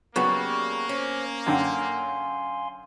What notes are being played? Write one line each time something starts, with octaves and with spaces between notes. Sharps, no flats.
C#3 F#3 G3 A#3 B3 F#4
C#4 C5
F#2 D3 F5 G5 G#5 C6